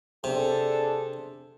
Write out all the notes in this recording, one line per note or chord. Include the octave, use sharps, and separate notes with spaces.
C3 D4 G#4 A4